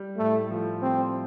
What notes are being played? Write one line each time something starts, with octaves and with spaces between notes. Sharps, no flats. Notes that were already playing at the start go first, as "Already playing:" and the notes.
Already playing: G3
A2 A3
F3
G3 C4